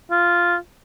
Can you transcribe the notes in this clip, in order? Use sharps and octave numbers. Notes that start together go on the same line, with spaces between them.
F4